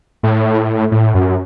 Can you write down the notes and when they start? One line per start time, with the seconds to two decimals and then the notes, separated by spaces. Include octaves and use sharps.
0.23 A2
0.92 A2
1.14 F#2